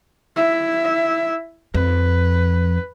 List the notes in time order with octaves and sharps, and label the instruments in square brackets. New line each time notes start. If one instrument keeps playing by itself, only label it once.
[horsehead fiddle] E4 E5
[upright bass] F2 [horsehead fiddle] B4